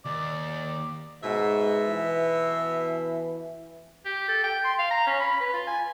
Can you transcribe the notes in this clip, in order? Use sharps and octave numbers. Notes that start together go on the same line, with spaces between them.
D#2 D5
G#2 B2 E5
E3
G4
A4
G5
C6
F5
A#5
C#4
B5
B4
F4
G#5